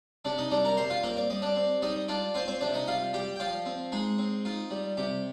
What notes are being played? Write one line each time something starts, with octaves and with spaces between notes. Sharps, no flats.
C3 D4 D5
D#4 D#5
G3 D4 D5
A#4 A#5
G3 C5 C6
F4 F5
A#3 C4 A#4
D5
G3 D#5
D4 D5
C4
G3 D#4 D#5
D4 F4 D5
C4 F4 C5
C4 C5
C3 D4 D5
D#4 D#5
G3 F4 F5
G3 G4 G5
G5
F3 F4 F5
C4
G#3 D#4 G#4
C4
D#4 F4
G3
C3 G4